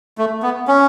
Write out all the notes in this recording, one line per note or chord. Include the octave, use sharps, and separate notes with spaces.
A3
B3
C#4